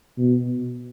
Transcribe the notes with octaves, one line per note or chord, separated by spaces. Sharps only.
B2